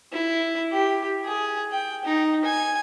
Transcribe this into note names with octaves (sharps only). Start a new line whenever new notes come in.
E4
G4
G#4
G5
D#4
G#5